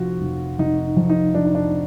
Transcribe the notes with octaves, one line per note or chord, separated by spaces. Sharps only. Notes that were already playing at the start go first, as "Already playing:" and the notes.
Already playing: F1 F2 F3 F4 F#4
F1
F1 D#4
F2
D#4
F3 D4
D#4
D4